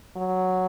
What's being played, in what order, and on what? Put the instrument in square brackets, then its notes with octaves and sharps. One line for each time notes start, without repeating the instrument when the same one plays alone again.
[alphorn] F#3